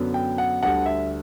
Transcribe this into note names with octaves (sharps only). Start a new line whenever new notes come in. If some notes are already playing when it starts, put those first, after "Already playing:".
Already playing: F#2 D3 F#3 B3
G5
F#5
D2 D3 G3 F#5
E5